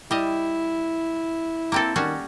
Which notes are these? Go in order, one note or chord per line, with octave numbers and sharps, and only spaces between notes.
G3 E4 D#5
A#3 C4 A4
D#3 G3 C#4 F#4